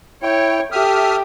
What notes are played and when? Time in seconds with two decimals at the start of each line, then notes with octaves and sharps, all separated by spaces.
0.23 E4 C#5 G5
0.72 G4 A4 E5 D#6 F6